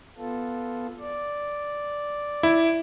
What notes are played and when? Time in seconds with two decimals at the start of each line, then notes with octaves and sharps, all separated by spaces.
0.18 B3 F4 A4
0.99 D5
2.43 E4